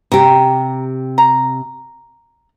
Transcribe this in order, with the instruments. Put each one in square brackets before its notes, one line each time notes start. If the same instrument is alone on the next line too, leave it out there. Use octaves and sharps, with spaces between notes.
[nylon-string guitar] C3 G4 [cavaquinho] A#5
[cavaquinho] A#5